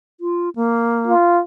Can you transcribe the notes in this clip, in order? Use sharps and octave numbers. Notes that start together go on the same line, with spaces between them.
F4
A#3
F4